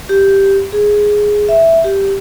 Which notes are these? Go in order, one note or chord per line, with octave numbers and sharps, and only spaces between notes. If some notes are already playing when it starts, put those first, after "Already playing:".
G4
G#4
E5
G4